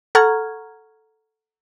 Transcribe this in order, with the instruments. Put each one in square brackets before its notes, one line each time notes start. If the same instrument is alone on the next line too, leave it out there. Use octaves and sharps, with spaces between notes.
[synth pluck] A4 F#5 A#5 C#6 F6 G#6